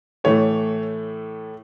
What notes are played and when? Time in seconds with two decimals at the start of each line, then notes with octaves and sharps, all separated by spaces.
0.24 A2 E3 A3 C#5